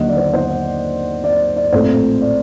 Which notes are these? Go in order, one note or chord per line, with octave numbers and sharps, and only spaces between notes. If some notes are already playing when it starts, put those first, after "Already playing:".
Already playing: D#2 D3 F#3 A#3 D#4 D#5 F#5
D5
C5
C5
D5
D5
A#1 A2 A3 C4 C5
D5